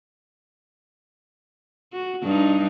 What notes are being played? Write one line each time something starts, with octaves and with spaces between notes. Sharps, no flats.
F#4
G2 D4 D#4